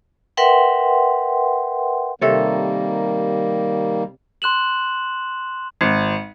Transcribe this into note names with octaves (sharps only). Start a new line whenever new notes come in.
A#4 B4 E5 F#5 G5 C6
C3 D#3 G3 A#3 A4 C#5
C6 F#6 E7 F#7
G#1